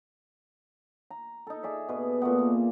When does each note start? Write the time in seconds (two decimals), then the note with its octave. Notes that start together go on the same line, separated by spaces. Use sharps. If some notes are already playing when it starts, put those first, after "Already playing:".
1.11 A#5
1.47 D#4 A4
1.63 G#4 D5 E5
1.89 B2 B4
2.22 A#2 A3 B3
2.39 A#3